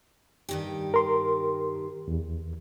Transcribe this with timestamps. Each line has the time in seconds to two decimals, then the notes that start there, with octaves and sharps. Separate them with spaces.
0.49 G2 D#3 G4
0.94 A#4 C6
2.08 E2